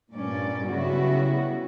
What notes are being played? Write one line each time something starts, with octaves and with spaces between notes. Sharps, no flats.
G2 A#2 C#4 D5
C#3 F#3 G3 B3 E4 F#4